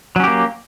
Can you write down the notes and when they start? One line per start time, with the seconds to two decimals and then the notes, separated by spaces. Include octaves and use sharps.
0.16 F#3
0.20 C#4
0.24 G4
0.28 A#3